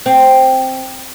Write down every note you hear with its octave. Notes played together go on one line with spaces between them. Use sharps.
C4